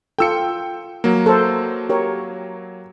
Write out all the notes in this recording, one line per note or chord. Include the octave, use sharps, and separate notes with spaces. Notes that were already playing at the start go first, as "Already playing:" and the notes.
F4 A4 G5 E6 C#7
F#3 A#3
A4 C5
G4 A#4 C#5